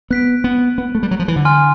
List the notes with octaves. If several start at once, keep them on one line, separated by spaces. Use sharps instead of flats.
B3 F#6 B6 D7
B3
B3
A3
G3
F#3
F3
E3
D3
G#5 C6 F6